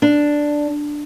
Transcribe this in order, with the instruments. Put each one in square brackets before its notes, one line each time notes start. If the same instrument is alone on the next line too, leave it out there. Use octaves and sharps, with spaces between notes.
[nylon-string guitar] D4